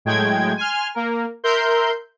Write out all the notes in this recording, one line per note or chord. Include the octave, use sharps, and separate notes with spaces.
A2 F#3 G#3 A3 G5 G#6
G#5 C6 F6
A#3 A#4
A#4 E5 C6 G6